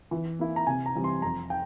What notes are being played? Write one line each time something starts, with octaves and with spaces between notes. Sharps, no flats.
E3
A#3 E4
A#5
C3 G#5
A#5
E3 G3 C4
C6
F2 A#5
G5